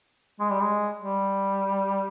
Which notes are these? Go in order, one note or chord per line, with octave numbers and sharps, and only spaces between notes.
G#3
G3
G#3
G3